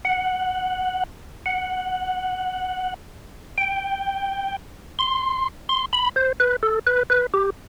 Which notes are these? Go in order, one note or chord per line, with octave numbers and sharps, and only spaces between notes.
F#5
F#5
G5
C6
C6
B5
C5
B4
A4
B4
B4
G4